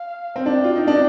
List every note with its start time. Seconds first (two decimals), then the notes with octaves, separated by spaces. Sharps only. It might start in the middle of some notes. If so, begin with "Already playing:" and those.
Already playing: F5
0.36 C4
0.45 D4 G5
0.64 F4
0.76 D#4
0.87 D4